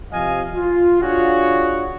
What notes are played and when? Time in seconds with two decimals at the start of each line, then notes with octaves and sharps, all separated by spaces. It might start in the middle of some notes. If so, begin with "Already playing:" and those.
0.12 C3 F3 D#5 F5 G#5
0.56 F4
1.01 D4 F4 F#4 G#4 C#5